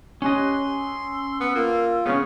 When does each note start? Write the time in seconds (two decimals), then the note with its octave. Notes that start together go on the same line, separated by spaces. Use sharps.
0.22 C#4 G4 C#5 D#5 C6 F#6
0.78 E6
1.40 B3
1.55 A#3 F4
2.06 C#3 B3 C#4 F6